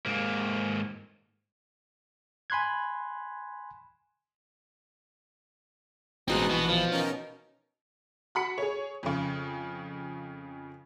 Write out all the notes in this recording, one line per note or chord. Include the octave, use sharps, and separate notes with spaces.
G#2 A#3
G#5 B5 C6 F#6 G#6
A1 B2 G#3 C4 D#4 C6 F#6
A#1 E3 B3 F#4
F3
C#4 D#4 A#4
F#4 B5 C#7
G#4 C#5
F2 C#3